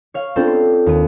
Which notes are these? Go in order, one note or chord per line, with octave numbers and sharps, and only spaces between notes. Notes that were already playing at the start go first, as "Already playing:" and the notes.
C#5 F5
B3 C4 D4 F4 A4 C5
C6
D#2 D#7